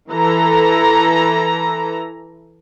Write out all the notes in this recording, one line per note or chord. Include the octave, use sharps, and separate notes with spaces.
E3 A4 A#5